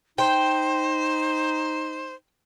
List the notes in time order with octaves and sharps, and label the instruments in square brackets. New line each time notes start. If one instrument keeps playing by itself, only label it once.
[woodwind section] D#4 [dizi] C5 [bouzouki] G5